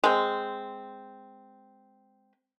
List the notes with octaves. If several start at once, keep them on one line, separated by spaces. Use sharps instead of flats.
G#3 C4